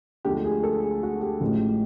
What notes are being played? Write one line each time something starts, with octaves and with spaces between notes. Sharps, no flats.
D2 D3 F3 G#3 G4
G#4
A4
G#4
F#4
G4
A1 A2 F3 G#3